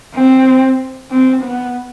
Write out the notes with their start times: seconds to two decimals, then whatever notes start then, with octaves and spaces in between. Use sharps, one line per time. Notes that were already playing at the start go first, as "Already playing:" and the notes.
0.15 C4
1.11 C4
1.42 B3